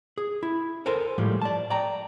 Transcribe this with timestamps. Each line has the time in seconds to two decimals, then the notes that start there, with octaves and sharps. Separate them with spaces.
0.18 G#4
0.43 E4
0.86 A4 A#4 C5 G#5
1.18 A2 F3 G3 G#3
1.42 D5 A5
1.70 D5 G5 A#5